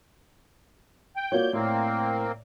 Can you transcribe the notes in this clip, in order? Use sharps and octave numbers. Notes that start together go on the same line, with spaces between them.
G5
A#3 F4 F#4 C#5 D5 G6
A2 A#3 C4